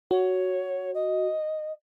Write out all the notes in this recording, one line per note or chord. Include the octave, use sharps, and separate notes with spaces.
F#4 C#5
D#5